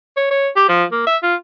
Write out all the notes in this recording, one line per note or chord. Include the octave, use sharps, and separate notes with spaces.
C#5
C#5
G4
F3
A#3
E5
F4